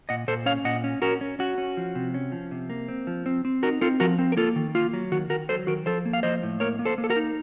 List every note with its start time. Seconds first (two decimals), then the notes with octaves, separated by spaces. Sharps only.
0.09 A#2 D#5 F#5
0.28 A#2 A4 C5
0.46 C#4 C#5 F5
0.65 A#2 D#5 F#5
0.84 C#4
1.02 C#4 F#4 A#4
1.21 C#4
1.39 C#4 F#4
1.58 C#4
1.77 F3
1.95 C3
2.14 C#4
2.32 F3
2.51 C3
2.70 A#3
2.88 C4
3.07 F3
3.26 C4
3.45 C4
3.63 D#4 F#4 A#4
3.81 C4 F4 A4
4.00 F3 F#4 A#4
4.19 C4
4.32 A#4
4.37 A#3 F4 A4
4.56 D#3
4.74 A#3 F4
4.93 F#3
5.12 D#3 F#4
5.30 D#3 F#4 A#4
5.49 F#3 A4 C5
5.67 D#3 F#4 A#4
5.86 F3 A4 C5
6.05 A#3
6.13 F5
6.23 F3 C5 D#5
6.43 A2
6.60 A#3 A#4 C#5
6.79 A#3
6.85 A4 C5
6.98 A#3
7.04 A4
7.10 F#4 A#4
7.16 D#4